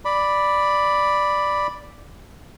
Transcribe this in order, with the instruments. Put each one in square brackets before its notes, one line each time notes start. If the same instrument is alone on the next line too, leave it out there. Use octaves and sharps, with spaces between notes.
[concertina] D5 B5